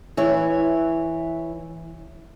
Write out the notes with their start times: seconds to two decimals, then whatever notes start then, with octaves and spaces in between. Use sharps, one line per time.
0.17 E3 E4 C#5